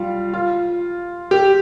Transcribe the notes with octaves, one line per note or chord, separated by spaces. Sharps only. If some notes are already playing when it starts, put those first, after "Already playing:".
Already playing: G3 F4
F4
G4